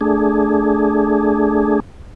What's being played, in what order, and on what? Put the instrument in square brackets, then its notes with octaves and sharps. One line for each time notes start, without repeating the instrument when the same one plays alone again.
[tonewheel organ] A3 D4 G#4